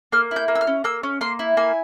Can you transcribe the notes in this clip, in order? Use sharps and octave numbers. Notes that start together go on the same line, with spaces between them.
A#3 F6
E4
G6
A#3
E6
F6
C#4
A#3 E6
C#4
A#3 C6
E4
A#3 G#5